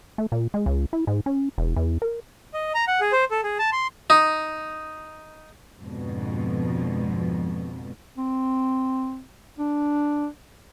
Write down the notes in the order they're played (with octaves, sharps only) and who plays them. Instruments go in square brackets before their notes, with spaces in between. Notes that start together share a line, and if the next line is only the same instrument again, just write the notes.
[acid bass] A3
A#2
G#3
C#2
E4
G#2
C#4
E1
E2
A#4
[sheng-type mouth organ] D#5
A#5
F#5
G#4
C5
A4
G#4
A5
C6
[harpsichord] D#4
[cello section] F2 G#2 B2 D3 F3
[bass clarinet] C4
D4